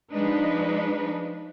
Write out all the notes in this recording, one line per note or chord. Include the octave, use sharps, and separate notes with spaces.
F3 G#3 D4 D#4 B4